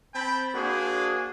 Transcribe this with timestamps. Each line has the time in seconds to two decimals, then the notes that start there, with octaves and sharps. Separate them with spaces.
0.14 C4 G5 A5 B5
0.54 A#3 D4 F#4 G#4 C5